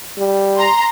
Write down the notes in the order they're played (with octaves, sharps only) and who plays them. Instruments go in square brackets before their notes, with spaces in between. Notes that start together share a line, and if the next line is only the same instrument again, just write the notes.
[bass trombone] G3
[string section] A#5 C6